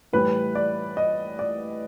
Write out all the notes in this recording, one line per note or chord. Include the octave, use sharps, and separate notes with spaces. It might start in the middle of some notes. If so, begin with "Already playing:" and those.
A2 E3 G3 B4
D5
D#5
D5